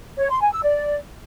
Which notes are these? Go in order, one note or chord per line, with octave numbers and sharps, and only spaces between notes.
C#5
C6
G#5
E6
D5